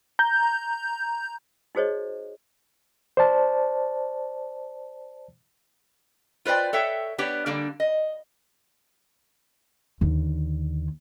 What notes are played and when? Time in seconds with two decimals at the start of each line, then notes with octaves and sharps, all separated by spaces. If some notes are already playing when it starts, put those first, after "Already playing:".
0.19 A#5 G6
1.75 D#4 F#4 G#4 C5 C#5 D#5
3.17 C5 D5 A5
6.45 F4 B4 C5 D5 G5
6.73 A4 C#5 E5 G5
7.18 B3 D4 G4 C#5
7.46 D3 G3 A#3 D4
7.80 D#5
10.01 D#2 D3